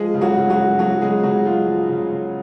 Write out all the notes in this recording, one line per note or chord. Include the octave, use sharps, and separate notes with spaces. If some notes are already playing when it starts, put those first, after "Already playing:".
Already playing: F3 G#3 G#4
C#3
F#3 F#4
C#3
F#3 F#4
G#3
F3 F#3 F#4
C#3 G#3 G#4
C#3 F#3 F#4
G#3 F4
F3
C#3
C#3